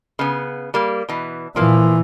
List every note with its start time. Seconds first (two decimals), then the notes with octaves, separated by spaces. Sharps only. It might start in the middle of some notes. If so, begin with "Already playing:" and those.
0.19 C#3 B3
0.74 G3 A#3
1.09 B2 E3
1.56 A#2 E3 F3 A#3